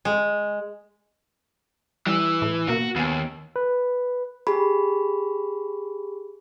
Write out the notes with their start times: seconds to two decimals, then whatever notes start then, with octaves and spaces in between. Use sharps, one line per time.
0.05 G#3
2.07 E3 G3
2.42 A2
2.68 B2 A#3 F#4
2.96 D#2 B3 G#5
3.56 B4
4.47 G4 G#4 B5